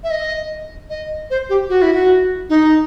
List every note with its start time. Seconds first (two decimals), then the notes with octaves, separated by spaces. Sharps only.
0.04 E5
0.11 D#5
0.90 D#5
1.30 C5
1.49 G4
1.69 F#4
1.82 E4
1.94 F#4
2.49 D#4